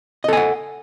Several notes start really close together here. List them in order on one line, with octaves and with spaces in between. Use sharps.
D#5 A4 G#5 F#5